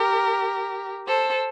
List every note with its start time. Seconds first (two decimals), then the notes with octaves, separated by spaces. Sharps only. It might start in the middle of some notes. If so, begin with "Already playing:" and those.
Already playing: G4 A#4
1.07 A4 C5